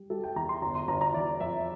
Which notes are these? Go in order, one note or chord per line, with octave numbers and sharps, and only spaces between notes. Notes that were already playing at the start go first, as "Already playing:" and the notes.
Already playing: G3
G3 A4
G5
E2 A#5
C6
G1 A#5
C6
G1 A#5
A#5
E3 D5
F2 E5